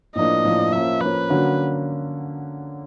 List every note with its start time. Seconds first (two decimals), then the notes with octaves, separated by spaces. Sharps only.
0.15 A2 F3 A#3 D4 D#5
0.44 A2 F3 A#3 D4
0.73 F3 A#3 C#4 E5
1.01 F3 A#3 C#4 B4
1.30 D3 F#3 A#3 C#4 F#4